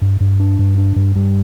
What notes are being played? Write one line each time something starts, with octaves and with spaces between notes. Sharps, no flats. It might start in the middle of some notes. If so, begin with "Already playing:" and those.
G2
G2
D4
G2
D4
G2
G2